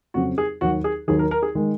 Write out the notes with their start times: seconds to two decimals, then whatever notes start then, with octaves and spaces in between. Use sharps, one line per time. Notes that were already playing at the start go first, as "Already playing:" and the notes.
0.14 F2 C#3 F#3 C4 F#4
0.38 G#4
0.61 D#2 D#3 F#3 F#4
0.84 G#4
1.08 D#2 D#3 F#3 G#4
1.19 A#4
1.31 A#4
1.43 G#4
1.55 D#3 G#3